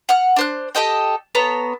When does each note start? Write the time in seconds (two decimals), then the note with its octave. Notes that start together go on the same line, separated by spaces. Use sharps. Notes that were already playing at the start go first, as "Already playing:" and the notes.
0.09 F#5 F6
0.36 D4 C5 F#6
0.75 G4 A4 D#5 G5
1.35 B3 A4 C#5 A#5